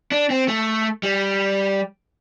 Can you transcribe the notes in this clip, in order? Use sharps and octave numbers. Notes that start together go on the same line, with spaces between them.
D4
C4
A3
G3